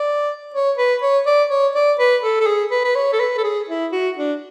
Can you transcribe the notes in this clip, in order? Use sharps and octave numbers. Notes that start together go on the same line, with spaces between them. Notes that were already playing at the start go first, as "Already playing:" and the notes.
Already playing: D5
C#5
B4
C#5
D5
C#5
D5
B4
A4
A4
G#4
B4
B4
C#5
A4
B4
A4
G#4
E4
F#4
D4